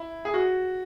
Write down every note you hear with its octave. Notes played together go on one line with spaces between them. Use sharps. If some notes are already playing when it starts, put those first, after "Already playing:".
Already playing: E4
G#4
F#4